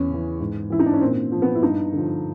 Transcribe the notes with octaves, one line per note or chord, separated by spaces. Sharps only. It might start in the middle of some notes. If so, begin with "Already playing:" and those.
Already playing: E2 C#4
C#3 E3
G#2
E3 E4
D#4
D4
C#4
A#2 C4
F3
B3
E4
G2 D#4
D3 F3